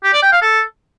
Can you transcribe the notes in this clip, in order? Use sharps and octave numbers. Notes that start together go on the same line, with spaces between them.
G4
D5
G5
F5
A4